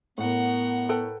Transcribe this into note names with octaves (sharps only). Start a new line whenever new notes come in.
A2 B3 A#4 F#5
A4 B4 G5